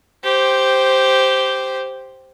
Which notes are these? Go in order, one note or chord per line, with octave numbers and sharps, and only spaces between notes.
G4 C5